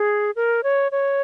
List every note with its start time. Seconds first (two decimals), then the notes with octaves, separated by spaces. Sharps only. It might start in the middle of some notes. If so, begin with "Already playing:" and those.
Already playing: G#4
0.36 A#4
0.64 C#5
0.92 C#5